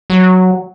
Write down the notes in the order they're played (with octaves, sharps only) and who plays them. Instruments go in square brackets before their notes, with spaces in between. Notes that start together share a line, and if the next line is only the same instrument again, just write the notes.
[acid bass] F#3